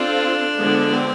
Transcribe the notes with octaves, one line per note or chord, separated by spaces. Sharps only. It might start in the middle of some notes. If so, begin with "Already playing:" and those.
Already playing: C4 D4 F4 A4
D3 F3 G#3 B3
C4